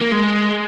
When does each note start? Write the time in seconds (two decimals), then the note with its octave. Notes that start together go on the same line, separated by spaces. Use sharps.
0.01 A#3
0.12 G#3